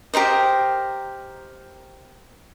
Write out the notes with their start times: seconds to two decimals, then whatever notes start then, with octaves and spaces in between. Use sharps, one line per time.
0.14 G4 A#4 C5 D#5